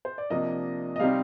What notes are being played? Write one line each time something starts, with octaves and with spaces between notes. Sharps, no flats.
C5
D5
C3 F3 A#3 D4 D#5
D#5
C3 G3 C4 D#4 F5